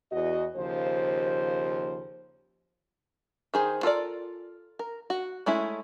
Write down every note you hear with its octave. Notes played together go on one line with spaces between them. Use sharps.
E2 F#4 D#5
D#2 C#3 F3 C5
D#3 G#4 C5
F4 A4 A#4 D5
A#4
F#4
G#3 A3 C#4 E4